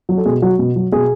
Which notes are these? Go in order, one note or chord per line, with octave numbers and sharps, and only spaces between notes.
F#3
A4
B2 G#4
F#3 F#4
B2
F#3
B2 G#4